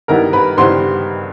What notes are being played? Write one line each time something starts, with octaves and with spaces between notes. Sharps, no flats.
G2 D#3 G3 B3 E4 A#4 A#5
B4 B5
G2 D#3 G3 B3 E4 C5 C6